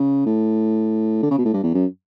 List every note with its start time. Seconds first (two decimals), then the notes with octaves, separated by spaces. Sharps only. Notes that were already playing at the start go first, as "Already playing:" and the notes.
Already playing: C#3
0.26 A2
1.23 D3
1.31 C#3
1.38 B2
1.45 A2
1.53 G2
1.63 E2
1.74 F#2